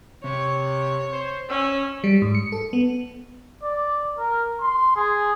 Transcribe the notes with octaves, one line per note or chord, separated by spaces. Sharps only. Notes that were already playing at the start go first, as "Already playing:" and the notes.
C3 C#5
C5
C#4 E6
G3
G#2
C#7
A4
B3
D5
A#4
C6
G#4